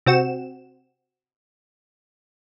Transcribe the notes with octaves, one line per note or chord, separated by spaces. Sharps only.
C3 C4 F#4 E7